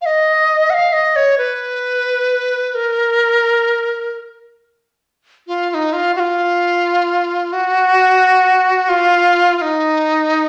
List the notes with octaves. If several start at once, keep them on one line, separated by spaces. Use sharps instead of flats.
F5
D#5
F#5
F5
D#5
C#5
B4
A#4
F4
F4
D#4
F4
F#4
F4
F#4
F4
F4
D#4